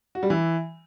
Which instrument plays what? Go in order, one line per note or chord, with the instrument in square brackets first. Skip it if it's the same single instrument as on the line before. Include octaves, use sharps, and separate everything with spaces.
[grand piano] F#4
G3
E3